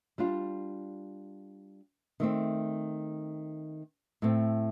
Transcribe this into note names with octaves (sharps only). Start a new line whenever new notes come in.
G3 D4 F4
D#3 A3 C4
A2 A3 C4